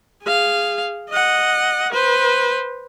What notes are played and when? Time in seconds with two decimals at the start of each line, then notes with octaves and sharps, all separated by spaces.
0.23 G#4 F5
1.09 D#5 F#5
1.93 B4 C5